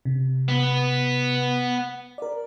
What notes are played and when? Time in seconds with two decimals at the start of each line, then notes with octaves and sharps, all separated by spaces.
0.05 C3
0.48 B3
2.18 A#4 D5